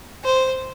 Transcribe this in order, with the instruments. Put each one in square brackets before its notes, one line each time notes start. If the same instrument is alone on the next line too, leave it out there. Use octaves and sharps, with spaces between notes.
[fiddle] C5